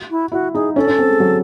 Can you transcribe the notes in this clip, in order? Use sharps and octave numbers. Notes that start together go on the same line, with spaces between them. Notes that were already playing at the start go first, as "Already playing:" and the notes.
Already playing: F#4
E4
E4 F#4
D#4 G#4
C#4 A4
C#4
C4
G#3
F#3